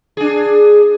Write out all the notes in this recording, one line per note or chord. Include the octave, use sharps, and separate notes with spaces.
D4 G#4